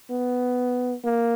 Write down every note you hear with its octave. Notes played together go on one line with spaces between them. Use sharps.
B3
A#3